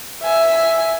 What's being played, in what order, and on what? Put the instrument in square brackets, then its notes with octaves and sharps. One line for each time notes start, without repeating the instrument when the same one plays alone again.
[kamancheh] E5 G#5